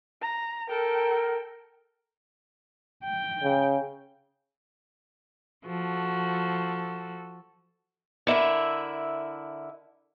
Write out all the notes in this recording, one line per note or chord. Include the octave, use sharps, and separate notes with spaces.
A#5
A4 A#4 G5
G5
C#3
F3 F#4 A4
D3 E4 A#4 E5